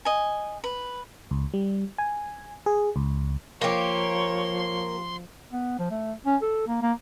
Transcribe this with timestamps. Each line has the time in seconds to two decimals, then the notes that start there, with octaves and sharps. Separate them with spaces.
0.05 D#5 G#5
0.64 B4
1.31 C#2
1.54 G3
1.98 G#5
2.66 G#4
2.96 C#2
3.62 F3 A#3 G4 C#5 C6
5.52 B3
5.79 F3
5.91 A3
6.26 C#4
6.42 A4
6.67 A#3
6.82 A#3